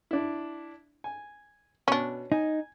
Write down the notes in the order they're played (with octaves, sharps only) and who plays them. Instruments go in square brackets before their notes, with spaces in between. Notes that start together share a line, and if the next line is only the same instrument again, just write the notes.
[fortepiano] D4 E4
G#5
[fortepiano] B2 [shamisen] C#4 D4
[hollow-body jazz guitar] D#4 [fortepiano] G#5